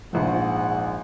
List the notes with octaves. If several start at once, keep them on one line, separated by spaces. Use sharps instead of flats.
A#1 G#2 F3 F#5